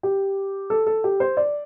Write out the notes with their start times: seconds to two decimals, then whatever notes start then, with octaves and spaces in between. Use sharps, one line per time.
0.03 G4
0.70 A4
0.87 A4
1.04 G4
1.20 C5
1.37 D5